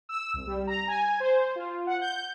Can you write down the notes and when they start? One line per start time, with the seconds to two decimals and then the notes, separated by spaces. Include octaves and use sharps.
0.09 E6
0.34 C2
0.47 G3
0.67 A#5
0.88 G#5
1.20 C5
1.56 F4
1.87 F#5
2.01 G6